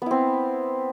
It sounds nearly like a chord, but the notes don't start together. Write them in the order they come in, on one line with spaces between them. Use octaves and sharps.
B3 E4 C4